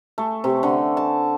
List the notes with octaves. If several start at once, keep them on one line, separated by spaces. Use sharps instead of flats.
A3
C3
D3
A5